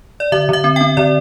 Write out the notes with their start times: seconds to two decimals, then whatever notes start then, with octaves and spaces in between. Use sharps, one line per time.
0.20 D5
0.32 D3 E5
0.49 D3 E5
0.64 C4
0.76 C4 G5
0.97 D3 D5